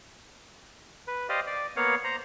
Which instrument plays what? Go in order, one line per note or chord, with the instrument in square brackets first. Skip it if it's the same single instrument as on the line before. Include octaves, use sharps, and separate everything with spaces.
[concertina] B4
G4 C5 D5 D#5 F5
D5
A#3 B3 C#5 F5 F#5
C5 A#5